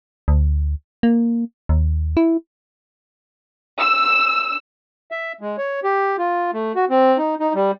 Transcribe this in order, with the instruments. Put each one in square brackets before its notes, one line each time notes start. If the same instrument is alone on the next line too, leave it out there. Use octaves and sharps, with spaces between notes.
[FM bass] D2
A#3
D#2
E4
[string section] E6
[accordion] E5
G#3
C#5
G4
F4
A3
F#4
C4
D#4
D#4
G3